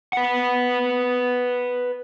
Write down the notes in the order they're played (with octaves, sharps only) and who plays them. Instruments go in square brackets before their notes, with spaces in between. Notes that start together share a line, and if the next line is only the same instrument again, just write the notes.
[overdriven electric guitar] B4 F#5